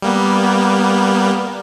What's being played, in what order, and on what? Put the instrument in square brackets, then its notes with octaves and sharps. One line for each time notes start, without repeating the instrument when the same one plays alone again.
[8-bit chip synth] G3 A#3 B3